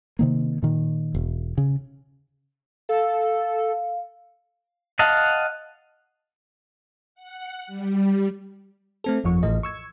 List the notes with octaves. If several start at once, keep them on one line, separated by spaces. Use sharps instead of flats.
C3 D#3 A#3
A#2 D#3
E1
C#3
A4 F5
D#5 F5 F#5 A5
F#5
G3
A3 C4 A4
G1 F2 F3 C#6
A1 A2 E3 A3 D#5
C#6 E6 G#6